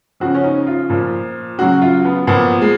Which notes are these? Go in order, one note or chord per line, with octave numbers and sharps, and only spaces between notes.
C#3 F3 F#4
C#4
D#4
F4
A#2 F3
C#3 F#3 F#4
F4
B3
A#2 F3 B3
G#3